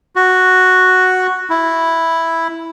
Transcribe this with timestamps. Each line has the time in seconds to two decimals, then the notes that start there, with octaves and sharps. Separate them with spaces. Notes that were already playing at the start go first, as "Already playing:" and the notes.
0.16 F#4
1.50 E4